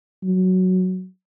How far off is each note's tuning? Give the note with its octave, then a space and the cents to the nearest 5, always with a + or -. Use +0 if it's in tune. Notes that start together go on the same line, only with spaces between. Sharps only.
F#3 +0